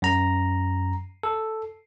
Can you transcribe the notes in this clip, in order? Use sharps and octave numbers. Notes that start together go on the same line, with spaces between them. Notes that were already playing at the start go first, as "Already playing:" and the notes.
F#2 A#5
A4